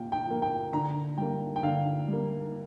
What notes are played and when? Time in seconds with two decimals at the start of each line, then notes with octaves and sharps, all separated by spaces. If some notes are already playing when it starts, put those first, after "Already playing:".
Already playing: A#2 G5
0.12 G5
0.27 F3 A#3
0.42 G5
0.72 D3 A#5
1.17 G3 A#3 G5
1.56 G5
1.63 D3 F5
2.08 G3
2.13 A#3